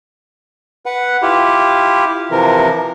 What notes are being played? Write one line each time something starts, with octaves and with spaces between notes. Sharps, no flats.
B4 F#5
E4 F4 G4
C3 E3 F3 A#4